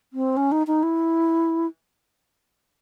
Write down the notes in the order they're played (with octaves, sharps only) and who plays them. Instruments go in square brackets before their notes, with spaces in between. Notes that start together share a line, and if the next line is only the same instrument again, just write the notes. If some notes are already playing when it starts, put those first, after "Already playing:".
[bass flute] C4
C#4
D#4
D#4
E4